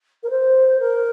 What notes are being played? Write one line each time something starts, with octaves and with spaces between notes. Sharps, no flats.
A#4
C5
A#4